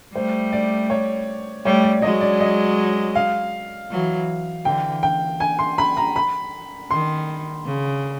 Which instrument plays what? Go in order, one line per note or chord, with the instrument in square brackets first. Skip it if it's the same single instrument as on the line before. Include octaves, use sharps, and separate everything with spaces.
[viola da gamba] G3 A3 [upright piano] C5
[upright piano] D5
C#5
[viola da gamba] G3 A3 [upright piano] C#5
[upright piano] D5
[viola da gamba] F#3 G#3 [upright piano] D#5
[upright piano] D5
D#5
F5
[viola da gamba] E3 F#3
[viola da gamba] D3 E3 [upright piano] G5
[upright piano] G5
G#5
C6
B5
A#5
B5
[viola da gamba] D#3 [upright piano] C6
[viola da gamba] C#3